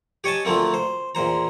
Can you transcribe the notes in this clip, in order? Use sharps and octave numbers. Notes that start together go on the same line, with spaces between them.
G4 C#5 D#5 G#5 A5
D2 F3 A3 A#3 C4
C5
E2 A#2 C5 A#5